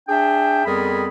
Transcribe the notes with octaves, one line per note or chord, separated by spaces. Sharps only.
D4 G#4 E5 G5
F2 G3 B3 G#4 A#4 B5